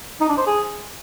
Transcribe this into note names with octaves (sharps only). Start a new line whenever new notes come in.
D#4
D4
C5
G#4